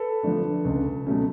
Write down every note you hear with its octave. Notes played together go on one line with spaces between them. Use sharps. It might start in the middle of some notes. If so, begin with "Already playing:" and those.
Already playing: A4 B4
D3 F3 A3 D4
C#2
B2 F#3 A3 C#4